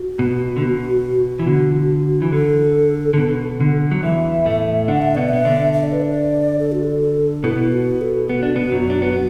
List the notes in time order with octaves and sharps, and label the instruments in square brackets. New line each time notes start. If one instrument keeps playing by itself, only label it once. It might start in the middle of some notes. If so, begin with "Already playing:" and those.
Already playing: [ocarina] F#4
[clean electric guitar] B2
D3
B2
E3
D3
E3
[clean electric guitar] D3 [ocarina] A4
[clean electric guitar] D3
B2
D3
F#3
[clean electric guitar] E2 E3 [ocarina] E5
[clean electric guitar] A2 A3
[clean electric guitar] D3 D4 [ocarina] F#5
[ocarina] E5
[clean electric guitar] B2 B3 [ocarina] D5
[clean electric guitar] B3 [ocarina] E5
[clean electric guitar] D3 D4
[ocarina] E5
D5
B4
D5
A4
F#4
A4
[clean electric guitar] B2 B3 [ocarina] E4
[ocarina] F#4
A4
[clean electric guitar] B3 [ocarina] F#4
[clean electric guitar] D4
B2 B3
F#2 F#3
D4
B3